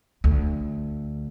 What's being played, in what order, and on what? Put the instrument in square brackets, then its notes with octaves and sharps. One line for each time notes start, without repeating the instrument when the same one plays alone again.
[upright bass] D2